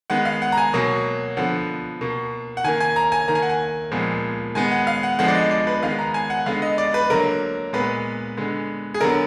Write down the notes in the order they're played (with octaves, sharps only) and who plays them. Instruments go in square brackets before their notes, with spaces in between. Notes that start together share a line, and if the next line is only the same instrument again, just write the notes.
[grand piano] D#3 G#3 B3 F#5
F5
F#5
A#5
G#5
B2 F#3 A#3
D3 F3 B3 F#5
B2 A#3
F#5
D#3 A#3 G#5
G#5
A#5
G#5
D#3 A#3 A#5
G#5
F#5
G#5
A#2 F3 G#3 B3
D#3 G#3 B3 G#5
F#5
F5
F#5
D3 F3 G#3 B3 F#5
D5
D#5
D5
B4
D#3 G#3 B3 F5
A#5
G#5
F#5
D3 G#3 B3 F5
D#5
D5
B4
D3 F#3 A#3 A#4
A#2 G#3 B3 B4
D3 G#3 B3
G#4
D3 F#3 B3 A#4